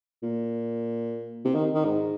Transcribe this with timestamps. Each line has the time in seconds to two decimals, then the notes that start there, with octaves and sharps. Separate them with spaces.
0.23 A#2
1.45 C3
1.55 D#3
1.75 D#3
1.85 G#2